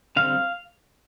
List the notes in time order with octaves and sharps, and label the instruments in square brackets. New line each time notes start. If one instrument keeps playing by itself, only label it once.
[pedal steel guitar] D3 G3 C4 F5